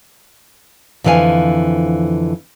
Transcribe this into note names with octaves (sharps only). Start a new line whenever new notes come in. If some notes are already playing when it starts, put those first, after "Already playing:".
F2 D3 E3 A4 F5 G#5